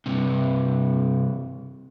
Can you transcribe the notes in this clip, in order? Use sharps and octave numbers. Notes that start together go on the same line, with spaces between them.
G2 C3